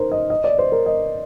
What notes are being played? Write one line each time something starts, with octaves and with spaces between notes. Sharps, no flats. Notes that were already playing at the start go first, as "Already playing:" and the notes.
Already playing: D#4 A#4 C5
D#5
D#5
D5
C5
A#4
D#5